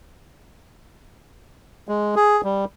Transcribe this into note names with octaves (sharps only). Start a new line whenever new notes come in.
G#3
G#4
G3